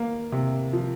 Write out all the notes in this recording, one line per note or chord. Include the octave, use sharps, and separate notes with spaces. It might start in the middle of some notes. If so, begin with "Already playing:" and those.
Already playing: A#3
C3
F3